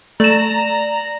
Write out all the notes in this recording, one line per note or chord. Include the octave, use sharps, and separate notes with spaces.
A3 D5 A#5 E7